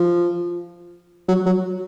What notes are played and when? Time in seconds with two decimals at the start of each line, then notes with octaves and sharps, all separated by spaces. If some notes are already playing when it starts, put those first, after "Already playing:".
Already playing: F3
1.28 F#3
1.46 F#3